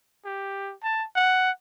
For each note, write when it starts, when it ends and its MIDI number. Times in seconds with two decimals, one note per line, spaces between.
0.25 0.73 67
0.83 1.04 81
1.16 1.51 78